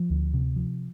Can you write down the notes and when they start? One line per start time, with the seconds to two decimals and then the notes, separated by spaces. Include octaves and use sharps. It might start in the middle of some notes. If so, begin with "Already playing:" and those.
Already playing: F3
0.10 D2
0.34 C3
0.56 F3